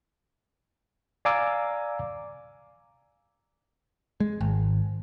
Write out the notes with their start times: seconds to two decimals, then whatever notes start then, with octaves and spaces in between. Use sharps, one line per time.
1.25 D5 F5 G#5 A#5 D6 E6
4.20 G#3
4.41 G#1